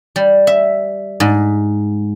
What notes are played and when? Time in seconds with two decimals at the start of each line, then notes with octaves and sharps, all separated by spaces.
0.16 G3
0.47 E5
1.20 G#2